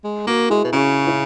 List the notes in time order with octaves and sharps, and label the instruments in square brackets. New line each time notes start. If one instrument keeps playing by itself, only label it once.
[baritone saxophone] G#3
[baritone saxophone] A#3 [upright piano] F#4 A#4
[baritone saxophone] G#3 [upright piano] E4 G#4
[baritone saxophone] B2
[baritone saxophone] C#3 [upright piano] C#4 E4
[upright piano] C#4 E4